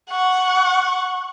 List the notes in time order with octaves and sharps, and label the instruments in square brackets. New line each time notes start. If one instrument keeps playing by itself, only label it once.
[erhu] F#5 [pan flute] C#6